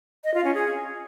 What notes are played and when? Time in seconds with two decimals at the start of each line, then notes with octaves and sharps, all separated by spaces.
0.24 D#5
0.34 F4
0.44 C#4
0.54 G#4